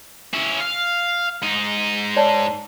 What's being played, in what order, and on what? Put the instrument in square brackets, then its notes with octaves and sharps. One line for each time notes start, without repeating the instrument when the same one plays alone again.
[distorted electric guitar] C#4 E4
F5
G#2 D#4
[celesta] C#5 D5 A5